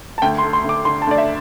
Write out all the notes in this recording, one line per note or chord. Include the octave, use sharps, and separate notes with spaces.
A5
D2 G5
C6
A3
C6
D2
D6
D3 C6
A5
D2 D5
E5